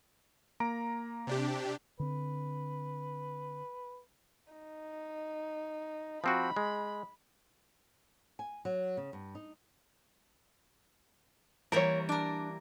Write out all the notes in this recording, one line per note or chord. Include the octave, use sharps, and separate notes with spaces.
A#3 A#5 D7
C3 D4 G4
D3 C4 B4
D#4
F3 C4 F#4 B5
G#3
G#5
F#3
C#3
G2
D#4
E3 G3 A#3 A#4 C#5
D4 A#4 D5